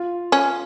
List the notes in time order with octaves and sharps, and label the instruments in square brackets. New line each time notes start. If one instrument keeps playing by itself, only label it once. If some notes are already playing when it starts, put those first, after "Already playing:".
Already playing: [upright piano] F4
[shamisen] C#4